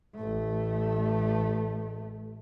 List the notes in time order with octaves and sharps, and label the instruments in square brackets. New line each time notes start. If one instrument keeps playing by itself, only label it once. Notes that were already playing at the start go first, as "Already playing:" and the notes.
[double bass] A1 A3